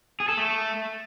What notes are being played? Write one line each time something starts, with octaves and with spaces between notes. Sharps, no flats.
G#4
A4
A3